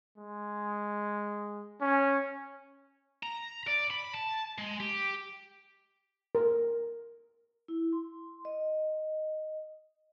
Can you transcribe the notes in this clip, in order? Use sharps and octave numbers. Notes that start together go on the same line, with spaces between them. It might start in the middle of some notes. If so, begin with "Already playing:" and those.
G#3
C#4
A#5
D5
B5
A5
G#3
G4
A#4
E4
C6
D#5